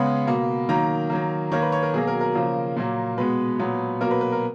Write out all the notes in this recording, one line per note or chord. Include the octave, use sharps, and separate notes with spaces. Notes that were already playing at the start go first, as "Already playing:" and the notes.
Already playing: C#3 G#3 B3 B5
B2 A#3
D#3 F#3 A#3 A#5
D#3 F#3 A#3
D#3 A#3 C#5
B4
C#5
A#4
B2 F#3 A#3 G#4
A#4
A#4
C#3 F3 A#3
A#2 F#3 A#3
B2 G#3 B3 B4
A#2 F#3 B3
B2 F#3 A#3 A#4
B4
B4
A#4